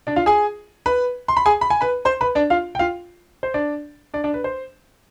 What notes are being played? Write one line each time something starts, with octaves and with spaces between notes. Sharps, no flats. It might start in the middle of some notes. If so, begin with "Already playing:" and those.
D4 D5
F4 F5
G#4 G#5
B4 B5
C6
B5
G#4 G#5
B5
G#5
B4 B5
C5 C6
B4 B5
D4 D5
F4 F5
G5
F4 F5
C5
D4 D5
D4 D5
D4 D5
B4
C5